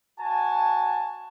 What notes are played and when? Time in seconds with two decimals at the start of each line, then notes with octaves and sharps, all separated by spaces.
0.21 F#4 G#5 A5